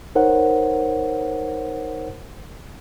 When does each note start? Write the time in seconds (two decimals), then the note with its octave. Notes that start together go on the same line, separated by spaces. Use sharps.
0.15 D#4 A#4 C5 C#5 F#5